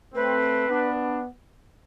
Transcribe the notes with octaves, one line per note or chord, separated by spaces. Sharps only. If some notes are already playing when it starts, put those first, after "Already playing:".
A3 C4 B4
B3 D4